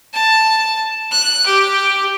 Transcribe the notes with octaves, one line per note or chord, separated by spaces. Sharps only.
A5
F#6
G4